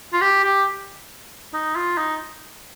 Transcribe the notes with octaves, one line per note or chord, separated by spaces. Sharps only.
F4
G4
G4
D#4
F4
D#4